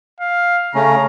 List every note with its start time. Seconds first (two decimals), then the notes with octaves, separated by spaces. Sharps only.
0.20 F5
0.75 C#3 A3 C#4 A#5